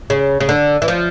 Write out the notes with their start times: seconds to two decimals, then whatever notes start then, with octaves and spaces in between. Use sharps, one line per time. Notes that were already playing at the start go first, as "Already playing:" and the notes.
0.10 C#3
0.40 C#3
0.49 D3
0.82 E3
0.88 F3